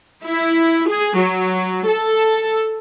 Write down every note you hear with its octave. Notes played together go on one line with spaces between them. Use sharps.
E4
G#4
F#3
A4